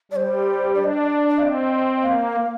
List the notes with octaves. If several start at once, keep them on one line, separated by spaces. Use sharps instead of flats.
G3 C5 D5
D4 D5
D#5
D5
D5
C4 D#5 F5
A#3 F5